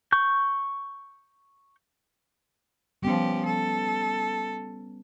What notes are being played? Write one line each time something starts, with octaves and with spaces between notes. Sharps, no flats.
C#6 G6
F3 G3 B3 C#4 G4
A4